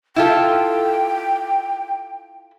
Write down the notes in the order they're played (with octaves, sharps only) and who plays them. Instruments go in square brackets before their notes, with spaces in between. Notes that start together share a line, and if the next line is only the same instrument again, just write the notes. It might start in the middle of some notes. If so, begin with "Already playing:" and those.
[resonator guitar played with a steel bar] E4 F4 A4 [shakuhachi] G5